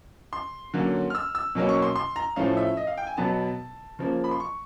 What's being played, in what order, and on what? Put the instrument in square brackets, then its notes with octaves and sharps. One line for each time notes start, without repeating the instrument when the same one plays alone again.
[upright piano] C6
D3 F#3 A#3 C#4
F6
E6
E6
B2 F#3 A#3 C#4
C#6
C6
C6
A#5
A2 F3 A3 C#4 F5
E5
D#5
F5
G5
G#5
B2 F#3 B3 A5
C#3 F3 A#3
B5
C6
C#6